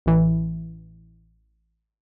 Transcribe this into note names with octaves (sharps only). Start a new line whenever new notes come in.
A1 E3